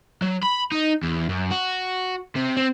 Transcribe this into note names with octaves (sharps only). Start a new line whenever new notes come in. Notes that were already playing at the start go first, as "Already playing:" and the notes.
F#3
B5
D#4
E2
F#2
F#4
C3
C4